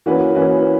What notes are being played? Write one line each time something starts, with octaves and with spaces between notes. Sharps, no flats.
E3 A#3 C#4 F#4 B4
E3 A#3 C#4 F#4 B4